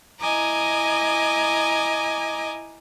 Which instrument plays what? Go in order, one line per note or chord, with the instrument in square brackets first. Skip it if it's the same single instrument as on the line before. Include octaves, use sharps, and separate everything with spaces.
[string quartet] E4 D#5 G#5 A#5 D6